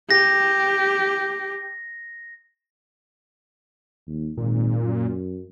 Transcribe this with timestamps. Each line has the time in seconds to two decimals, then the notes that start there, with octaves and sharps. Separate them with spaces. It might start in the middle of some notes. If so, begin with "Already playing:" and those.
0.11 G4 A#6
4.07 D#2
4.37 G#1 A#2
4.84 F#2